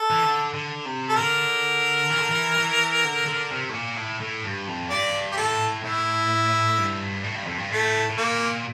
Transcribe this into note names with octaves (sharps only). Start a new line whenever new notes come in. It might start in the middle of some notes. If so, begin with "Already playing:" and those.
Already playing: A4
E3
D3
D3
C3
A4
D3 A#4
E3
D3
E3
E3
D3
D3
C3
A2
A#2
A2
A2
G2
F2
G2 D5
G4
A2 A4
A2 E4
G2
A2
G2
F2
G2
A2 A3
A2
A#2 A#3